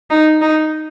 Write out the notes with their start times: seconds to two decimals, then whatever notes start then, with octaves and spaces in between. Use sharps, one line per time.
0.10 D#4
0.42 D#4